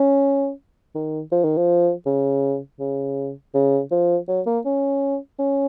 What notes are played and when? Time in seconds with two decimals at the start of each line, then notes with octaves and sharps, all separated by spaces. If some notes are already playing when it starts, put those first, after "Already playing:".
Already playing: C#4
0.95 D#3
1.32 F3
1.44 D#3
1.57 F3
2.06 C#3
2.79 C#3
3.54 C#3
3.91 F3
4.28 F#3
4.46 A#3
4.65 C#4
5.39 C#4